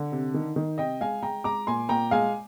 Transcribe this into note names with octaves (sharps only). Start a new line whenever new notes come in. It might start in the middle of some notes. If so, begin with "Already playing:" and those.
Already playing: D3
C3
D#3
D#3
C3 D#5 G5
G#3 F5 G#5
G#3 G5 A#5
G#3 A#5 D6
A#2 G#5 C6
A#2 G5 A#5
G#3 F5 G#5